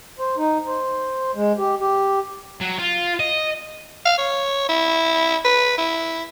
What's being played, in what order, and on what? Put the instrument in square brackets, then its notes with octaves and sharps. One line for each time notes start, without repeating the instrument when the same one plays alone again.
[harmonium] C5
D#4
C5
G#3
G4
G4
[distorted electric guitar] F#3
F4
D#5
[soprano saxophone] F5
C#5
E4
B4
E4